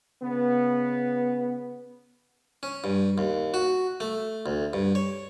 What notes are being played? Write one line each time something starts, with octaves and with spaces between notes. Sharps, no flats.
C#3 B3
C#4
G2
D#2
F#4
A3
D2
G2
C#5